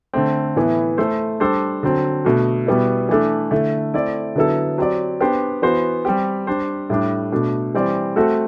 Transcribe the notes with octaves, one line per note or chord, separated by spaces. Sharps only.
D3 A3 C4
A2 E3 B3 E4
A3 E4 A4 C5
G3 D4 A4 C5
D3 F#3 C4
B2 A3 D4 F#4
B2 G3 B3 E4
E3 A3 D4 A4
D3 A3 E4
A3 C4 E4 A4 D5
D3 F#3 B3 E4 A4
F#3 C4 G4 D5
B3 D4 G4 C5
E3 B3 F#4 C5
G3 C4 G4
G3 D4 G4 C5
A2 G3 D4
B2 A3 D4
E3 G3 C4 G4 D5
A3 C4 F#4 A4